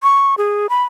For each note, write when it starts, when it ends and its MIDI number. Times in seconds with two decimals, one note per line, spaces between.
0.03 0.35 85
0.38 0.67 68
0.70 0.83 83